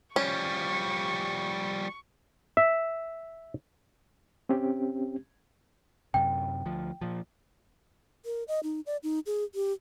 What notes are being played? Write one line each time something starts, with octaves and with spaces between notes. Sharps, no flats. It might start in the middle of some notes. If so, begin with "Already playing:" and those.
F3 G3 C#4 C#6
E5
C4 C#4 G4
F#2 C3 G5
D2 F3
A#2 F3
A#4
D#5
D#4
D5
D#4
G#4
G4